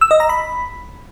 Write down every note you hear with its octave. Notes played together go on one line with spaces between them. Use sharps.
E6
D#5
A#5
B5